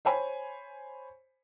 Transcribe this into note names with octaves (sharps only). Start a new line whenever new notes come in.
C5 C#5 G#5 B5